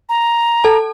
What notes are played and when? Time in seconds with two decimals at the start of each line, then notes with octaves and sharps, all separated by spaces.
0.09 A#5
0.64 A4 A5